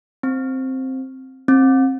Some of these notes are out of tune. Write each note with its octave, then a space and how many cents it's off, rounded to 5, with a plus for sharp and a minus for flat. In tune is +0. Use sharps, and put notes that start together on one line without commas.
C4 +5
C4 +25